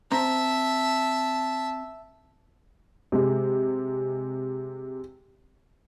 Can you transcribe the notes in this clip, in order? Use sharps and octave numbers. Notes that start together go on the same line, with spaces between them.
C4 E5 A5 A#5
C3 G#3